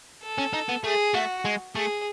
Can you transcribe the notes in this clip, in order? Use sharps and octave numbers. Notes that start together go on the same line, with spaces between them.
A4
C#4
D#4
B3
A3 G#4
A3 F#4
G#3
A3 G#4